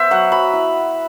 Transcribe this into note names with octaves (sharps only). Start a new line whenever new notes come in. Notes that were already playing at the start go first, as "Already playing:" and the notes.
Already playing: B3 C5 E5
F#3 F#5
F#3 B5
E4